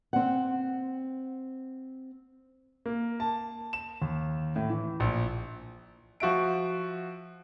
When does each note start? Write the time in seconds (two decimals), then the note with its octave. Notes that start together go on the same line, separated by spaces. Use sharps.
0.13 C4 F#5
2.86 A#3
3.20 A5
3.73 E7
4.02 D#2
4.56 A2
4.70 E3
5.00 A#1
6.20 F3 F#4 E5 D7